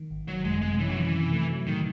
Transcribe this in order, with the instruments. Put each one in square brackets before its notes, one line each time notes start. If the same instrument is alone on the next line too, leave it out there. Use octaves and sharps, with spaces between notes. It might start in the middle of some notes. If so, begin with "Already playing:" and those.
Already playing: [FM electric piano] D#3
G#1
[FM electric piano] D#3 [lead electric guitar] F#3
[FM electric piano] F#2 [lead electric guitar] G#3
[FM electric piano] C3 [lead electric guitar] G#3
[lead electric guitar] E3 [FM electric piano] C#4
[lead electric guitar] F#3
[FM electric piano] D#3 [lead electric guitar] E3
[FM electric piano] C3
A3
F#3
[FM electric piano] A2 [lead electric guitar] D#3